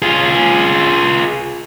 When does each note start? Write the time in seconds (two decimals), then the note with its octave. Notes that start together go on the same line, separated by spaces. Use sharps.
0.02 F4 G#4